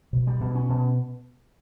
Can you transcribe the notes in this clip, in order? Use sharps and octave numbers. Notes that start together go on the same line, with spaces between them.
B2
G3
B2
C#4
B2